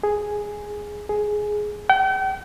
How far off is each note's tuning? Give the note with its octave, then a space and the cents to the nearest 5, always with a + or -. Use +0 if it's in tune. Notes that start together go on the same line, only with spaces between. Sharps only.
G#4 +0
G#4 +10
G5 -40